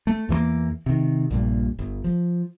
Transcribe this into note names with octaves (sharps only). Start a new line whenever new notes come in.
A3
E2 E3 G3 A#3
C3 D#3
A#1 G2 A#2
G1
F3